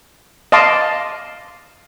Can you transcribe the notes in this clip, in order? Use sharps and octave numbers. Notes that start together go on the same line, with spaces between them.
D#5 F5 A5 C6 D6